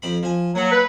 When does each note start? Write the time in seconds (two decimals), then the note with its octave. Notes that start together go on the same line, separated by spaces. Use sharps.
0.02 F2 C4 B5
0.23 F3 G#5
0.55 F#3 A#3 F#5
0.71 B4